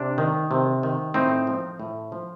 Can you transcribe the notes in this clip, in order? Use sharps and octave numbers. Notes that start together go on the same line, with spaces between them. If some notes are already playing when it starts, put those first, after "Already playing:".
Already playing: C3 D4
D#3
C3
D#3
A2 C4 D#4
F3
A2
F3